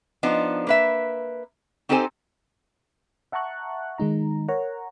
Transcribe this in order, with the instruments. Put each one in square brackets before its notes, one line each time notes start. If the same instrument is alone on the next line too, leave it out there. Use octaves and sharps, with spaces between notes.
[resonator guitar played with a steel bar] F3 B3 D4 D#4
A#3 B4 E5
C4 D#4 G4 A4 C5 G#5
[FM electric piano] E5 F#5 A5 A#5 C#6 F#6
D#3 G#3 D#4 A#5
A#4 C#5 F#5 A#5